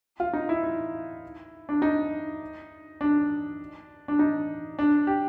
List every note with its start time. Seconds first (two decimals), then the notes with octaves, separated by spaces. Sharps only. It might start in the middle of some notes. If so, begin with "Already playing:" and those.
0.20 F4
0.33 D#4
0.49 E4
0.64 E4
1.69 D4
1.82 D#4
3.01 D4
4.08 D4
4.19 D#4
4.79 D4
5.07 G4